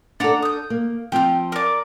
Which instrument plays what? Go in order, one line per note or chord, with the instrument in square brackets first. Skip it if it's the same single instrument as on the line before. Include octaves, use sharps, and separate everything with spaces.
[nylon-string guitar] D4 A4 [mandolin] D5 F#5 A#5
[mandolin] D#6 G6
[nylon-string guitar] A#3
[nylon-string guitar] F3 C4 F4 [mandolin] G5 F6
[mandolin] A#4 D5